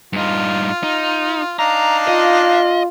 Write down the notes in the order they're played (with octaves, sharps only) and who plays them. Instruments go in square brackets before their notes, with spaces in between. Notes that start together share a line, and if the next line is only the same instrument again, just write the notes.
[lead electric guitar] G2 D#4 [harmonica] F4
[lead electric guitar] D#4
[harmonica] D4 D#4 F5 [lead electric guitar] A#5
[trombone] F4 [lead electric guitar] D#5